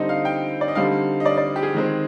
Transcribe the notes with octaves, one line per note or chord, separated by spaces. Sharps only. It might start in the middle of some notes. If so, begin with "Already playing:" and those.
Already playing: D3 G3 C4 D#4 D#5
F5
G5
D5
D#5
D3 G3 C4 D#4 F5
D#5
D5
D5
G4
G#4
D#3 G#3 C4